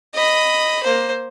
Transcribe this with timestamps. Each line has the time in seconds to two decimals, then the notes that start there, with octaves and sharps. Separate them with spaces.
0.14 D#5 B5
0.83 A#3 C5